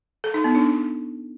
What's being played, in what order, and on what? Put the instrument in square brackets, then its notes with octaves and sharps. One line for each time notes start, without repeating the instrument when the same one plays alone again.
[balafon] A4
D#4
B3
D4